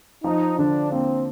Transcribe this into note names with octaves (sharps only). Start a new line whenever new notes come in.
F3 D#4
D3 D4
A#3 C4